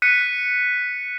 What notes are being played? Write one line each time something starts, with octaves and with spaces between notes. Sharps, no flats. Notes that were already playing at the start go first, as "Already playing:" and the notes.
F#6 B6 C#7 D#7